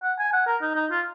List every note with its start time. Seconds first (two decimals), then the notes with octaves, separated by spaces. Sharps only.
0.03 F#5
0.19 G#5
0.33 F#5
0.47 A#4
0.62 D#4
0.76 D#4
0.91 F4